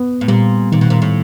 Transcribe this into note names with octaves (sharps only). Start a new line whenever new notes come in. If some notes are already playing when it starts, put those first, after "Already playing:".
Already playing: B3
A2
A#2 G3
A#2 D#3
B2
A#2
A2